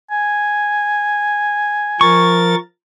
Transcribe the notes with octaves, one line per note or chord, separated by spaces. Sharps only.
G#5
F3 A#4 C#6 A6